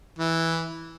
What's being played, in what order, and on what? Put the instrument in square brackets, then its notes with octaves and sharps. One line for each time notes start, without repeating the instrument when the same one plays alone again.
[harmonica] E3